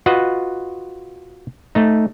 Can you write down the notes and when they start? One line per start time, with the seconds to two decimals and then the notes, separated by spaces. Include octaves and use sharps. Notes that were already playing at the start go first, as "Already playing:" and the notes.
0.06 F4 F#4 B4 D#5 F#5
1.75 A3 D#4